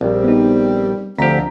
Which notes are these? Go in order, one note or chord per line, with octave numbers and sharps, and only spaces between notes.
A#1 G3 C4
B3 D#4
D2 D3 F3 C4 G4 A#5 B6